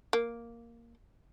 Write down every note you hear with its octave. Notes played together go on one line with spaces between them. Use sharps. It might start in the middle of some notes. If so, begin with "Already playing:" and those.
A#3